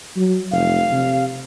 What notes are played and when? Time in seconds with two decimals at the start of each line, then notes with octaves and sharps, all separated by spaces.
0.16 F#3
0.51 F1 F5
0.92 C3